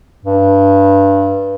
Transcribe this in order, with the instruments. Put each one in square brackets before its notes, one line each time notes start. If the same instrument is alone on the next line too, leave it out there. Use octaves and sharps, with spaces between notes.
[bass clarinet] G2